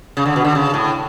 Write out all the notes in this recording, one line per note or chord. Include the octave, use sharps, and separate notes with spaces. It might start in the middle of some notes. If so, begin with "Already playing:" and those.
C#3
D3
B2
D3
C#3
A2